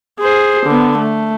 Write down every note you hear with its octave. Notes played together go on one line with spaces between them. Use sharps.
G#4 C5
D3 B3
A3